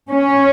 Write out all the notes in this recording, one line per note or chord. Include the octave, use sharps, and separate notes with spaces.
C#4